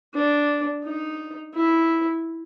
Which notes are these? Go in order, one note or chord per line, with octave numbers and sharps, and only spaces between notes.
D4
D#4
E4